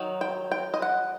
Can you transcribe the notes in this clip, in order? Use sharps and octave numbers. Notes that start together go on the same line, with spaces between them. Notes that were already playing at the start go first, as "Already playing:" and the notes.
Already playing: D#3 F#3
G5
G5
D#5
F#5